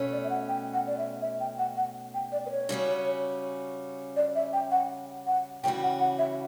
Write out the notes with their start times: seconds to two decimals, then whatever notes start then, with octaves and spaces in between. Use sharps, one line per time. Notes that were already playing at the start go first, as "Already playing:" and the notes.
Already playing: B2 A3 C#4
0.12 D5
0.24 E5
0.30 F#5
0.48 G5
0.73 F#5
0.87 D5
0.98 E5
1.22 E5
1.40 G5
1.58 F#5
1.77 F#5
2.14 G5
2.32 D5
2.46 B4
2.51 C#5
2.69 C#3 G3 C#4 F#4
4.16 D5
4.35 E5
4.53 G5
4.71 F#5
5.26 F#5
5.64 C#3 E3 G3 C#4 F#4 G5
5.83 F#5
6.00 F#5
6.19 E5